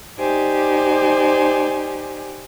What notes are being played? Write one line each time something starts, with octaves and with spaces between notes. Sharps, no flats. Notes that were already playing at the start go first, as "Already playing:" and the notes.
D#4 G4 C5 D5 G#5